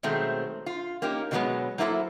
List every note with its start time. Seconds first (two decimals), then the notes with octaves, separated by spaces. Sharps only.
0.03 B2 D#3 F#3 G#3 A3 C4
0.66 F4
1.02 A#3 C#4 D#4 G4
1.31 B2 D3 F3 F#3 G#3 B3
1.78 F#3 A#3 E4 F#4 A4 C5